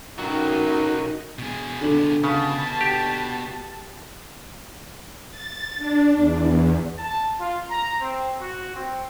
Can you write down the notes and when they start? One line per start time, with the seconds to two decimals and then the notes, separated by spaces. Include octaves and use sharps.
0.19 B1 F#3 C#4 D#4 F#4 A#4 F#5 G5
1.39 B2 G#4
1.81 D3 D4 F#7
2.24 C#3 B3 F#4 A5
2.81 G4
5.30 A6
5.77 D4
6.15 E2
6.98 A5
7.38 F4
7.70 A#5
8.00 C4
8.39 F#4
8.74 C4